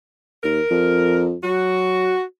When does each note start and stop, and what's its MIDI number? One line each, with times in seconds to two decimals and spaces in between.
0.44 0.60 39
0.44 1.24 70
0.71 1.36 41
1.43 2.13 54
1.43 2.22 66